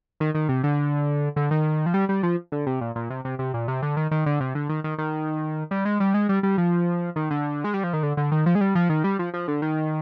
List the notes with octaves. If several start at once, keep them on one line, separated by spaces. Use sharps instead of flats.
D#3
D#3
C3
D3
D3
D#3
F3
G3
G3
F3
D3
C3
A#2
A#2
C3
C3
C3
A#2
C3
D3
D#3
D#3
D3
C3
D3
D#3
D#3
D#3
G3
G#3
G3
G#3
G3
G3
F3
D#3
D3
G#3
G3
F3
D#3
D3
D3
D#3
F3
G#3
G3
F3
D#3
G3
F3
F3
D3
D#3